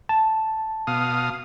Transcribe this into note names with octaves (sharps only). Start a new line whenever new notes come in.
A5
B2 F5 D#6